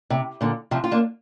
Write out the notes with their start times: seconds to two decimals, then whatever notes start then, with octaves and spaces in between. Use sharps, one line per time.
0.10 C3
0.41 A#2 D3
0.71 C3 F3
0.84 F4
0.91 A#3 D4